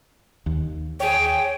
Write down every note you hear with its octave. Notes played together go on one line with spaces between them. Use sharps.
D#2
G#4 C#5 G5